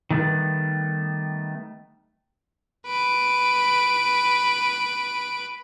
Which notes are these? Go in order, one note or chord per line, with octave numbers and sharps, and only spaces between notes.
D#3 G3 A3 B3
B4 D7